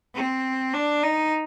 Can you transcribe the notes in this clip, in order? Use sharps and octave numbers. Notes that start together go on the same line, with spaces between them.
C4
D4
D#4